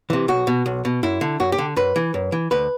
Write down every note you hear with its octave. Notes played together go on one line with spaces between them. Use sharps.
C3 E3
B1 F#4
B2
B1
B2
F#2 E4
D3
F#2 F#4
G4
D3
F#2 B4
E3
F#2
E3
D2 B4